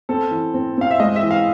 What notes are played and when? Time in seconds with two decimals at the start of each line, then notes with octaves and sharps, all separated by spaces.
0.09 C4 A4
0.31 E3
0.54 C4
0.78 C4 F5
0.91 E5
1.00 G#3 D#5
1.16 E5
1.23 E3
1.31 F5